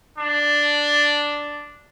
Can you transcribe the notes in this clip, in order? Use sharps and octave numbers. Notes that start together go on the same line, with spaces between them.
D4